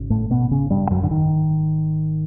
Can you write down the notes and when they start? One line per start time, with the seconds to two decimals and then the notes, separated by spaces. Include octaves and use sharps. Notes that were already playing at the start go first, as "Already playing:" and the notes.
Already playing: G#1 C#3
0.10 A2 A3
0.30 B2 B3
0.51 C#3 C#4
0.70 G2 G3
0.91 F#2 F#3
1.03 D3
1.11 D#3